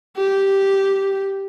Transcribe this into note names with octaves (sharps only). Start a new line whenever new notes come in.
G4